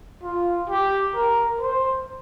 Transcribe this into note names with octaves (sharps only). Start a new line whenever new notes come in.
F4
G4
A#4
C5